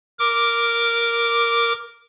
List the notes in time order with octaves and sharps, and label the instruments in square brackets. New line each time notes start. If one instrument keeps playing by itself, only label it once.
[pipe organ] A#4 D6